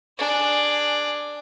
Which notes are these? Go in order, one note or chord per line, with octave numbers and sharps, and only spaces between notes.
D4 G#4